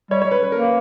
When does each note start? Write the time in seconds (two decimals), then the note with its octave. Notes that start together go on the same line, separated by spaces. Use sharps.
0.11 G3 C#5
0.22 G3 C#5
0.31 B4
0.43 B4
0.52 A#3 A#4
0.63 B4